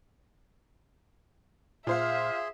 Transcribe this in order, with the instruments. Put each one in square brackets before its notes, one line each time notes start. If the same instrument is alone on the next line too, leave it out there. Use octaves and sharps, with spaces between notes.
[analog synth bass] A#2 [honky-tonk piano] F4 C5 F5 [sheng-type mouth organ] G#4 C6 [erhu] E5